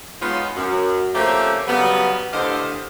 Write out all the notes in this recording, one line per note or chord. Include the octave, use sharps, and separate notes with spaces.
G#3 B3 C#4 D#4 F4
F#2
F3 A3 A#3 C4 C#4 G4
C#3 F#3 G3 B3
A2 D3 G4 C5 D#5 F5